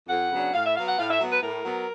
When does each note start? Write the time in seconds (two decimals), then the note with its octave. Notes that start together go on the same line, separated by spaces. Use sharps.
0.08 F2 F#5
0.31 C#3 F#3 B3 D4
0.53 A2 F5
0.64 E5
0.75 F#3 B3 F5
0.86 F#5
0.98 A2 F5
1.09 E5
1.20 F#3 B3
1.31 B4
1.42 A2 A#4
1.65 F#3 B3